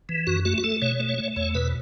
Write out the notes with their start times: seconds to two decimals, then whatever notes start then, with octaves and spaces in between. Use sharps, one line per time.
0.09 E3
0.27 F#2 F#4
0.45 A3 F#4
0.58 F#4
0.64 A3 A4
0.82 B2 C#5
1.00 A3
1.09 C#5
1.18 A3
1.36 E2 C#5
1.55 B2 B4